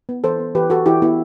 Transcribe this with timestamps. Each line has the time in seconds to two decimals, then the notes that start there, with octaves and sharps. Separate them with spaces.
0.09 B3
0.24 E3 A4 C5
0.39 B3
0.55 E3 G4 B4
0.70 E3 F#4 A4
0.86 E3 E4 G4
1.02 B3 E4